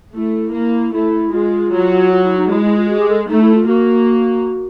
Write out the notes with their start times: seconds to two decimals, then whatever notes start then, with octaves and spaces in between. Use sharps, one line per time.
0.15 A3 E4
0.54 A#3
0.94 A3 E4
1.32 G#3 F4
1.73 F#3
2.11 F4
2.24 E4
2.37 D#4
2.50 G#3 E4
2.64 E4
2.77 F4
2.89 F#4
3.00 G4
3.09 A4
3.29 A3 D#4
3.42 E4
3.55 F4
3.68 A#3 F#4